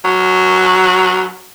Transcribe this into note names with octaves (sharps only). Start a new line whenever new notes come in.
F#3